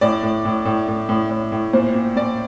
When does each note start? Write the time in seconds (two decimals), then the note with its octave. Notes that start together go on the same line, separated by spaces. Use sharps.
0.01 A2 D5
0.23 A2
0.45 A2
0.65 A2
0.88 A2
1.09 A2
1.30 A2
1.52 A2
1.73 A#2 C5
1.94 A#2
2.16 A#2 D5